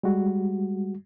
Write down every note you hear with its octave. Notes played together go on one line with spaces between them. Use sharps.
G3 G#3 F#4